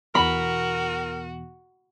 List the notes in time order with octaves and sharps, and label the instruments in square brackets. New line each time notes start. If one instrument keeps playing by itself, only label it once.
[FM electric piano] E2 B2 [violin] F#4 [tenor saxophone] A#4 [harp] B5